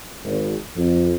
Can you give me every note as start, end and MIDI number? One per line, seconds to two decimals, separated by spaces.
0.24 0.56 32
0.76 1.16 41